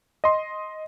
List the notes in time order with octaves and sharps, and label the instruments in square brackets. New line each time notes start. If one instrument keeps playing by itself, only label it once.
[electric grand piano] D#5 C6